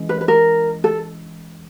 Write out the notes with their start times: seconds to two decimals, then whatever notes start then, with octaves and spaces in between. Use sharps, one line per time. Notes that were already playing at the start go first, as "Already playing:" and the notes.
Already playing: E3 G#3 C#4
0.09 B4
0.21 B4
0.28 A#4
0.84 A4